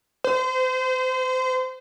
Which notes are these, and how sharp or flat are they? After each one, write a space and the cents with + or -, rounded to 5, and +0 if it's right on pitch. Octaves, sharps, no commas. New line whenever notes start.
C5 -30